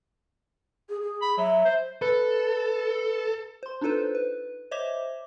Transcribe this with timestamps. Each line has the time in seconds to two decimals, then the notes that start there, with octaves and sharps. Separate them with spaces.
0.89 G#4
1.02 G#4
1.22 B5
1.37 F#3 E5
1.65 C5
2.02 A4 B4
3.63 C5 C6
3.81 D4 D#4 F4 A4 B4 C5
4.15 B4
4.71 C5 C#5 D#5 E5 D6